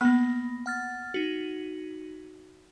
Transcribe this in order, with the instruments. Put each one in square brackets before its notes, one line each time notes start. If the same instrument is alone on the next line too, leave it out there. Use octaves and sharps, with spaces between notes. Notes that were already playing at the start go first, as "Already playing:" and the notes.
[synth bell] A#3 B5 [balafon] B3
[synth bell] F#5 F6 A6
D#4 F#4